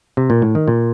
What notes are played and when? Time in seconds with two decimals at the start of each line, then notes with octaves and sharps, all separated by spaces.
0.17 C3
0.30 A#2
0.42 A2
0.55 D#3
0.68 A#2